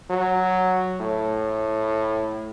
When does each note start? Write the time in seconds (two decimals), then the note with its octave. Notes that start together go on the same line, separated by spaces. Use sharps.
0.10 F#3
1.00 A2